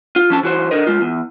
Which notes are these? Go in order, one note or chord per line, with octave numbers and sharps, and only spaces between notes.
F4
F3 C#4 A5
E3 F#4 C5
D3 A#4 D#5
G#3 F4
E2